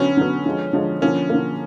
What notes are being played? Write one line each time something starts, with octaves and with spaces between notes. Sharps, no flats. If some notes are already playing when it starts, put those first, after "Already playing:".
Already playing: D3 F#3 B3 C#4
D3 F#3 B3
D3 F3 G#3
D3 F3 G#3
D3 F3 A#3 C#4
D3 F3 A#3